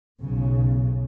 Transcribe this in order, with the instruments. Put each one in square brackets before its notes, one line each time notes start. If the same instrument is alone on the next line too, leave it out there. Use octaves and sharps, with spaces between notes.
[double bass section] B1 C#3